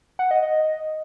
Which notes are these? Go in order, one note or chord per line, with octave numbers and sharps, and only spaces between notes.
F#5
D#5
D#5